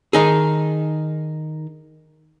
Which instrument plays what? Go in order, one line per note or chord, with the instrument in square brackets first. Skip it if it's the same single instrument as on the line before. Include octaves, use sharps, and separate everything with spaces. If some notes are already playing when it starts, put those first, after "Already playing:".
[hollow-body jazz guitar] D#3 D#4 G#4